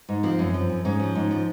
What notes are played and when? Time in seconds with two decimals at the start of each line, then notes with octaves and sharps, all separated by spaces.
0.09 G#2
0.23 F3 C4
0.39 F#2
0.54 F3
0.70 F#2
0.85 G#2 C#4
0.99 F3
1.15 G#2
1.31 F3